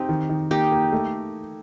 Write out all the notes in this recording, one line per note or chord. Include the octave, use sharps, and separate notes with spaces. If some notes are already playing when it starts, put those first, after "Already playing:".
Already playing: C4 D#4 G4
D#3
D#3
A#3 D#4 G4
A#3
A3